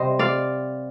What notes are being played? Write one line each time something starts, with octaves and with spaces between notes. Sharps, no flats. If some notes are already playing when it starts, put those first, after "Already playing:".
Already playing: C3 G3 C5 D#5
D5 F5